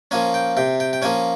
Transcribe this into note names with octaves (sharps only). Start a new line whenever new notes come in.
F3 A#3 C#4 G#5
G5
C3 G5
G5
G5
F3 A#3 C#4 G#5